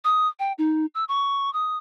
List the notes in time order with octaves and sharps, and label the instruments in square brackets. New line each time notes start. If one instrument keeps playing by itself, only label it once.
[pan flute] D#6
G5
D#4
E6
C#6
D#6